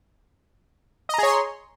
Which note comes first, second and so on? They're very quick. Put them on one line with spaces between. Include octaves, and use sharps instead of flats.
D#5 A#5 G#4 C#5 C6